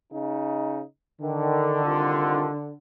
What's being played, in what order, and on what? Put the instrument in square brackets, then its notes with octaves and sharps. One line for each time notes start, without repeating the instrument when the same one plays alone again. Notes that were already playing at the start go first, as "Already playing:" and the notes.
[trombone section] C#3 D#4
[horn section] D3 [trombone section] D#3
[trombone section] C2 D#3 F4